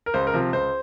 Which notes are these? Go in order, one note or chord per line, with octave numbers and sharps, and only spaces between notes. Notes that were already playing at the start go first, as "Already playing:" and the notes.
A#4
C#2 C5
A#4
C3 F3
C#2 C5